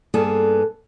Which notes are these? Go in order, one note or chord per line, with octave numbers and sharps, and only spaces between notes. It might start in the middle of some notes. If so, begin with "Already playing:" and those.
G2 A#3 B3 G#4 A4